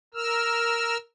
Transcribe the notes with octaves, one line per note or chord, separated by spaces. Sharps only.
A#4 E6 F6